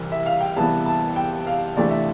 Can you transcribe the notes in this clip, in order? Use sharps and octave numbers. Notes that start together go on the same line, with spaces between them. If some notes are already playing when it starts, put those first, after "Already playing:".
Already playing: C2 C3 E3
E5
F5
G5
C2 C3 E3 B3 A5
A5
G5
F5
D2 C3 E3 A3 D5
E5